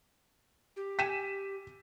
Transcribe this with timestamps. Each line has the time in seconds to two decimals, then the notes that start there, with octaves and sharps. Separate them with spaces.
0.76 G4
0.99 G5 G#5 B6 D#7 E7